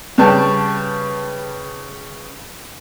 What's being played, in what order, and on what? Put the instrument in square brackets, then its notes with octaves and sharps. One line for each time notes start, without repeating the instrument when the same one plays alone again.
[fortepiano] C#3 G3 B4 G5 A5 C#6